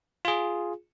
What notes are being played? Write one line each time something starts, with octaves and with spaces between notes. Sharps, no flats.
F4 G#4